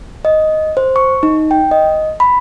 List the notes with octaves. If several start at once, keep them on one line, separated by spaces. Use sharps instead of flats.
D#5
C5
C#6
D#4
G5
D#5
B5